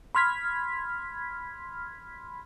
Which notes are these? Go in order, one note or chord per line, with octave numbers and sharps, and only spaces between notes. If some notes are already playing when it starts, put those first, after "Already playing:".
B5 C6 F6 G#6 B6